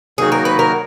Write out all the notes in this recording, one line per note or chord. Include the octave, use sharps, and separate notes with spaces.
D#3 F#3 A#3 D#4 F#4 G#4
A#4
B4
A#4